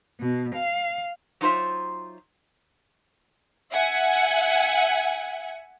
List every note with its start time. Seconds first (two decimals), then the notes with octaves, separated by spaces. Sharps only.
0.20 B2
0.56 F5
1.41 F#3 D#4 F4 C5 E5
3.72 E5 F#5 G#5